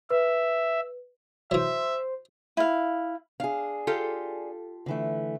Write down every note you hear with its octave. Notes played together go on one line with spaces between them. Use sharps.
B4 E5
E3 F#3 C5 E5
E4 F5
D4 G#4 F5
F4 G4 A4
D3 E3 A3